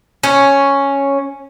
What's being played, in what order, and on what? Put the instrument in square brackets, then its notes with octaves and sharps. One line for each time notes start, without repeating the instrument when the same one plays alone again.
[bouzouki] C#4